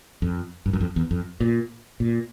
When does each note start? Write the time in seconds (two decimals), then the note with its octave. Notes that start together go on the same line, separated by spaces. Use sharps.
0.22 F2
0.66 G2
0.73 F#2
0.80 F2
0.96 E2
1.11 F2
1.40 A#2
2.00 A#2